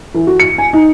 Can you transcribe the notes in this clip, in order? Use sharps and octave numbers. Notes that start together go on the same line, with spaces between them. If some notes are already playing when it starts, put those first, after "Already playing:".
E3
F#4
C#7
G#5
D#4